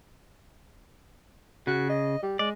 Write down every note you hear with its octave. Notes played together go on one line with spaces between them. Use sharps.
C#3 F#4
D#5
G3
G#3 D5